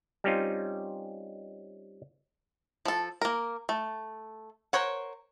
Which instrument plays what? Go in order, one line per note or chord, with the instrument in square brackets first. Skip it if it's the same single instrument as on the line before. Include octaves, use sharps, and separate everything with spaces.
[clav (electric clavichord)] G3 C4 C#4 D#4 F4
[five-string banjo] F3 A4
A#3 A#4
A3
A#4 C5 C#5 F#5